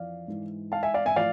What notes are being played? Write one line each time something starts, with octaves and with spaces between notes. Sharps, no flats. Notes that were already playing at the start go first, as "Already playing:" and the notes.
Already playing: F2 E3 D5 F5
G#2 E3
F5 A5
E5 G#5
D5 F5
E5 G#5
A2 F3 D5 F5